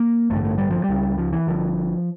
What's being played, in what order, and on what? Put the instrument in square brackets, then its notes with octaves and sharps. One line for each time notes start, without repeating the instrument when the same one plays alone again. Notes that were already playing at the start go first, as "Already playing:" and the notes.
Already playing: [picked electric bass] A#3
A1 G2 D3 A3
A3
G3
F3
G3
C#2 C#3
F3
E3
G1 G2 D3 F3